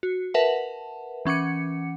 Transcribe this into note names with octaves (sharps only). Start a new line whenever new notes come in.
F#4
A#4 B4 E5 F#5 A5
E3 C#4 F#5 D6 C#7